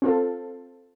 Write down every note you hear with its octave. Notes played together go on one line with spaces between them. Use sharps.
C4 F4 A4